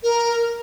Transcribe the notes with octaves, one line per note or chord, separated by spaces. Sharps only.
A#4